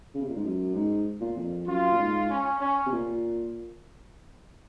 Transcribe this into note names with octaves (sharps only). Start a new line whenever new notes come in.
C#3
C3
A#2
G#2
F#2
G#2
A#2
F2
F#2 F4
A#2
G#2
C#4
C#4
C3
A#2